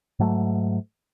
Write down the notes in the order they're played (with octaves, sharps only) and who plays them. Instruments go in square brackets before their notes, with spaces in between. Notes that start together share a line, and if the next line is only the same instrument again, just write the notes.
[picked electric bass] G#2 F#3 A3